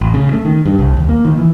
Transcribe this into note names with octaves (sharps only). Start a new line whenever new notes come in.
A1
C#3
A3
D#3
G2
C2
D#2
A#3
D#3
E3